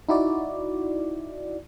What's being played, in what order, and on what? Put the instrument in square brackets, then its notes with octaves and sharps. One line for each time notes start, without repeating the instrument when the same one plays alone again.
[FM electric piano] D#4 E4 F#4 D5